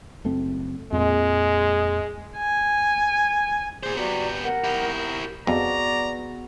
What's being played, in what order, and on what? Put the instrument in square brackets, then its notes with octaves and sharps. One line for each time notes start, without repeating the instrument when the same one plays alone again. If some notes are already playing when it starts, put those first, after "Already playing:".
[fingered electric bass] F#1 A3 C4
[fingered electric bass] F2 A#2 [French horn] G#3
[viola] G#5
[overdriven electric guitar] A#2 C5 [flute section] G#4
[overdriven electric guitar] B3 G4 [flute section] F#4 D5 A#5
[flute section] A#4 F#5
[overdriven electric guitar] E4 G4
[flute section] A#4
[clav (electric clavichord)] F2 [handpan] B3 F#4 G#4 [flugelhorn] D5 [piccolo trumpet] A#5